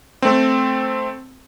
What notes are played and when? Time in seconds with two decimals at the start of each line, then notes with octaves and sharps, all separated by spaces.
0.22 A3 C4